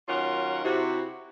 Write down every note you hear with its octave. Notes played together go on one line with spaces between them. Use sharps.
D#3 F#3 C#4 F4 A#4 F#5
C3 E4 F#4